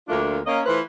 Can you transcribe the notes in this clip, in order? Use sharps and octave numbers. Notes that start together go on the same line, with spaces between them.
D2 F3 A3 A#3 D4 F4
A#3 C#4 D#5
E3 A3 F4 B4 C5